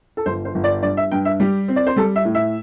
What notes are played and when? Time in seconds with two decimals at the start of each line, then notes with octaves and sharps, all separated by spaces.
0.17 A4
0.26 G1 C5
0.45 C5
0.55 G1
0.64 D5
0.83 G2 D5
0.97 E5
1.11 G2 G5
1.25 E5
1.40 G3 G4
1.68 C4
1.76 D5
1.87 C5
1.96 G3 A4
2.16 E5
2.25 A2
2.35 E5